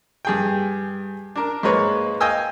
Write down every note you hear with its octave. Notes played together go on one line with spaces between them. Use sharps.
G2 G#4 G5
D4 A#4
G#2 G#3 A#3 B4 C#5
D#5 F5 G5 G#5 D#6 E6